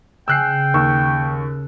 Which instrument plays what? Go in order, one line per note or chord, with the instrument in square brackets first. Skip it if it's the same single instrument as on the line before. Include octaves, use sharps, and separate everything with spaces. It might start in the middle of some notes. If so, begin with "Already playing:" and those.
[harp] C#3 [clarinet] G5 [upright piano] E6 F#6 C7
[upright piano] D#2 C#6 E6